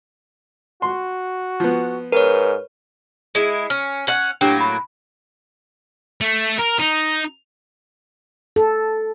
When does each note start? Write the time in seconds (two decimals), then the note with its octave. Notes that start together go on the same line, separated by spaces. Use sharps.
0.82 F#4 C6
1.60 F3 B3
2.12 G#2 A#4 B4 C#5
3.35 G#3 E4
3.70 C#4 F6
4.07 C#4 F#5
4.41 A2 F#3 A#3 D4 G4 G5
4.60 B5
6.21 A3
6.59 A#4
6.79 D#4
8.56 A4